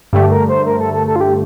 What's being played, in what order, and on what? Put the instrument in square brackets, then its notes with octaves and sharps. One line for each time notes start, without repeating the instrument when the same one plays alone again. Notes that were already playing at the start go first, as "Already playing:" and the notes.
[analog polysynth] G2 D3 A3 [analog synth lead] G4
[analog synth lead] A#4
C5
A#4
A4
A4
A4
F4
G4